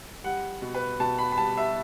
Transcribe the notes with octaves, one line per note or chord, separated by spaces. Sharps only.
G3 F#5
B2
B4
B2 A5
B5
B5
G3 A5
E5